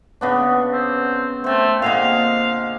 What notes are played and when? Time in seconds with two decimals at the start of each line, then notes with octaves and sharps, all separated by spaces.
0.21 C#3 B3 D4
0.73 C4
1.44 A3 C4 C5
1.82 A#2 D3 G#3 F5